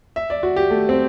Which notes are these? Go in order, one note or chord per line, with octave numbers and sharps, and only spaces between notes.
E5
D5
F#4
G4
A3
C4